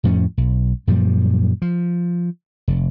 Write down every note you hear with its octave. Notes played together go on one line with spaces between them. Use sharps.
F2 A2 F3 C#4
B1
F#2 A#2 F3 G3
F3
F1